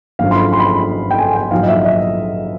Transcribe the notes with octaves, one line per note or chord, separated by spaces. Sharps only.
G#1 F#2 D3 F3 F5
C6
B5
C6
B5
C6
G5
G#5
G5
A#1 G#2 D#3 F#3 F5
D#5
E5
D#5